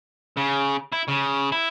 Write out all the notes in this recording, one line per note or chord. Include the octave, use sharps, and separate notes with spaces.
C#3
E4
C#3
E4